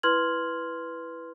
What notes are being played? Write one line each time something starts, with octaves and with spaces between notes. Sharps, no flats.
E4 B4 C6 F6 G#6 F#7